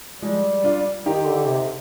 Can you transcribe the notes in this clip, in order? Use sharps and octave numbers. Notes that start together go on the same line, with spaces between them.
F3 G3 G#3
D4 F4
D#3 D#4 G4
D3
C3